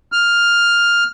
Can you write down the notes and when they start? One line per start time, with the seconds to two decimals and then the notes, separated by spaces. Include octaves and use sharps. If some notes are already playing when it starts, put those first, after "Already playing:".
0.12 F6